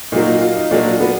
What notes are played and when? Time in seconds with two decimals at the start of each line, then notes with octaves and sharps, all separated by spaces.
0.12 A#2 F#3 A#3 D#4
0.41 F4
0.56 D#4
0.71 A#2 F#3 A#3 D4
1.00 B3